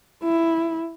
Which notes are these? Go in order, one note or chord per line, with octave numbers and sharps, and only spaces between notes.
E4